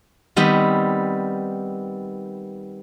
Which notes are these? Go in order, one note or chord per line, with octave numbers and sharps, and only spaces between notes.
D#3 G3 B3 C4